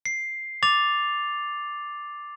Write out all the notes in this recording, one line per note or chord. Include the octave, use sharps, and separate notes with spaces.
C7
D6 A6 F7